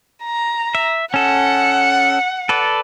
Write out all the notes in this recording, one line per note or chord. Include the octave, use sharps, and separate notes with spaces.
A#5
E5
C#4 A4 F#5
A4 B4 D5